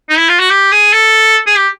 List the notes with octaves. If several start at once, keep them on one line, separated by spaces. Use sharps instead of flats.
D#4
E4
F4
F#4
G4
G#4
A4
G#4
G4